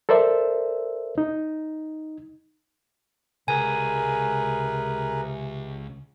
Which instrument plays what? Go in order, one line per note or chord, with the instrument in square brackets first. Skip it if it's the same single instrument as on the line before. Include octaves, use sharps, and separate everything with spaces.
[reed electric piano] A4 A#4 C5 D5 E5
D#4
[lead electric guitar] C#2 [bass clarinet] C3 [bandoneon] G#4 A#4 B4 [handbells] G#5